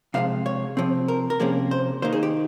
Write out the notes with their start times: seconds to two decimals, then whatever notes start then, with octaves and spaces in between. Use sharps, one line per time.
0.14 C3 F3 G#3 F5
0.46 C#5
0.77 C3 F3 C4
1.08 A#4
1.30 A#4
1.40 C3 F3 A#3 C#4 G#4
1.71 C5
2.02 D#3 A#3 D#4 C5
2.13 G#4
2.23 G4